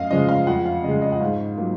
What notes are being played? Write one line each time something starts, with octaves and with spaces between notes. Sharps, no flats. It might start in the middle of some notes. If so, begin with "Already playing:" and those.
Already playing: F#2 D#5 F5
C#3 F3 G#3 D#5
F5
F2 F#5
F5
C#3 G#3 D#5
D#5
F#5
G#2 F5
F#3 A#3 F4